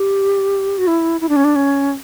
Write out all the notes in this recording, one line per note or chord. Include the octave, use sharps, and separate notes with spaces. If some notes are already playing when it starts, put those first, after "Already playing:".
Already playing: G4
F#4
E4
E4
D4
C#4
D4
C#4